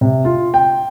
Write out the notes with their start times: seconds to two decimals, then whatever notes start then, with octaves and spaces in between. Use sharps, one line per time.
0.01 C3
0.25 F4
0.54 G5